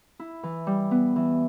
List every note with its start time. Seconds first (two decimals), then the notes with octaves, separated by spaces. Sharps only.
0.20 E4
0.43 E3
0.67 G3
0.91 B3
1.16 E3